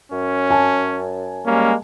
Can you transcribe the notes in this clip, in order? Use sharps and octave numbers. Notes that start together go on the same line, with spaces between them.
F#2 C#4
G#5 A5
G3 G#3 A#3 C#4